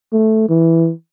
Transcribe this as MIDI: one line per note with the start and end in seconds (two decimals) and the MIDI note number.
0.13 0.45 57
0.49 0.91 52